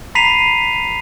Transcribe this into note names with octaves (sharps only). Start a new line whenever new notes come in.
A#5 B5 B6 C7 D#7 F7